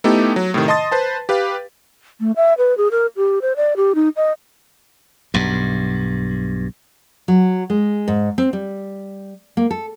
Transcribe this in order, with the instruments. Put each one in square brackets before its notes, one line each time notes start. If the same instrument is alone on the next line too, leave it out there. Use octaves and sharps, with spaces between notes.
[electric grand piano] A3 B3 D#4 E4 G4 A4
F#3
A2 C3 D#3
D#5 A5 C6 D#6 A6
B4 C5 A5
G4 B4 F5
[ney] A3
E5
B4
G#4
A#4
G4
C5
D5
G4
D#4
D#5
[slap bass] B1 G2
[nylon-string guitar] F#3
G#3
G#2
C4
G3
A#3
A4